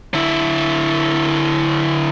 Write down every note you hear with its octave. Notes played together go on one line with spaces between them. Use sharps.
D3 E4